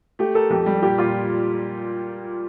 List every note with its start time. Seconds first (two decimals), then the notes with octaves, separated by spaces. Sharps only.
0.19 A3 G4
0.35 A4 A#4
0.50 F2 G4
0.66 G3
0.82 A#2 G4
0.98 A#2 F4